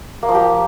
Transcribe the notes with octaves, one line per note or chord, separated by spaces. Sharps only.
A#3
F3
G4